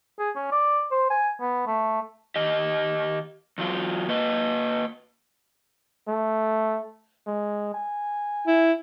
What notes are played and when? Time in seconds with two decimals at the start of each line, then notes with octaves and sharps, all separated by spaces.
0.19 G#4
0.36 C#4
0.52 D5
0.91 C5
1.10 G#5
1.40 B3
1.66 A3
2.36 D#3 G4 D#5
3.58 E2 F#3 F4
4.08 A#3 B4 D#5
6.08 A3
7.27 G#3
7.75 G#5
8.47 E4